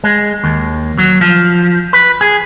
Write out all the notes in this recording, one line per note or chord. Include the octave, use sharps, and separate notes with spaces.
G#3
D#2
F#3
F3
B4
G#4